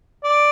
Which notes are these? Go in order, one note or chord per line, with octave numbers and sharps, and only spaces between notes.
D5